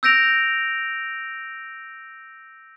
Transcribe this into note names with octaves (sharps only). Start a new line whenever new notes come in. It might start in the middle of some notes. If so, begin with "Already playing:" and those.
E6 G6 A#6 D7 F7